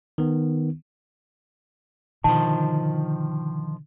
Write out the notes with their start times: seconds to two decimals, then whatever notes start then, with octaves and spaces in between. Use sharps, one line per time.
0.18 D#3 B3
2.24 B2 D3 D#3 F3 A5